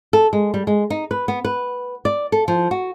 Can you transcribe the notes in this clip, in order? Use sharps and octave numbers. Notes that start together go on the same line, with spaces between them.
A4
G#3
G3
G#3
D#4
B4
B3
B4
D5
A4
F3
F#4